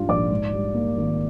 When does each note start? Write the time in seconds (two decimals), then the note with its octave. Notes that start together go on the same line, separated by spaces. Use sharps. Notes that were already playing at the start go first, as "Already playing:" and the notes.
Already playing: G#2 G3 D4 F4
0.08 A#1 D5 D6
0.31 G#2
0.52 G3
0.74 A#3
0.97 G#1